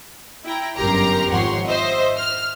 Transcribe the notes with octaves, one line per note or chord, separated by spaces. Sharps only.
E4 G5 A#5
G1 F#2 G4 A#4 A#5 C6
G#1 F2 C#5 F#5 C6
C5 D#5 E5
F6